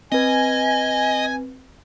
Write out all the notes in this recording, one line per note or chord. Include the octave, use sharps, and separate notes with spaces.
C4 B4 D#5 G#5